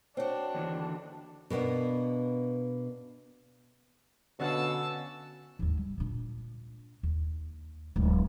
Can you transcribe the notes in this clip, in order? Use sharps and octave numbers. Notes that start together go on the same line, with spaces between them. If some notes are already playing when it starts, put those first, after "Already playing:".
C4 D4 F#4 C5 C#5
D#2 D3 E3
B2 A#3 B3 D4
B2 D3 C#4 F5 F#5 A5 E6
D#2 G#2
G3
A#2 D4
D#2
D1 G#1